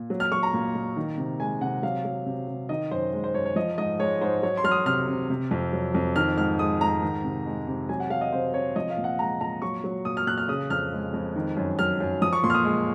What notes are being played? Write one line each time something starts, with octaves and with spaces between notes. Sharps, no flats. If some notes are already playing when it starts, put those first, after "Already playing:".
Already playing: A#2
F#3
F6
F#3 C#6
A#5
A#2
A#2
D#3
C3
G#3 G#5
C3 F#5
F#3 F5
F#3
C3
C3
D#3 D#5
F#2 C5
G#3
C5
F#2 C#5
C#5
F3 D#5
G#2 D#5
G#3 C#5
G#2 C5
F#3 C#5
C6
F#3 F6
D#6
C3 F6
C3
C3
F2
F#3
F2
D#3 F6
G#2 F6
G#3 D#6
G#2 A#5
D#3
C3
G#3
C3
F#3 G#5
F#5
F#3 F5
D#5
C3 C5
C3 C#5
F3 D#5
F5
A#2
F#5
G#3 A#5
A#2 A#5
F#3 C#6
F#3
A#2 D#6
F6
A#2 F#6
F6
C#3 D#6
F2 F6
G#3
F2
D#3
F#2
F#3 F6
F#2
F3 D#6
C#6
A#2 C6
F6
D#6
G#3